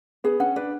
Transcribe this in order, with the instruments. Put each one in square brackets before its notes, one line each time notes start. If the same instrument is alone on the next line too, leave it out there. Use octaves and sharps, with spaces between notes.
[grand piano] B3 [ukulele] G#4
[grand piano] C#4 [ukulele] F#5
[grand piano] D4 [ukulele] B4